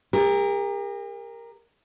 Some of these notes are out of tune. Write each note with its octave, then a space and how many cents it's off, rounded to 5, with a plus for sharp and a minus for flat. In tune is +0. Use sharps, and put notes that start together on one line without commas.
G4 +45 A#4 +0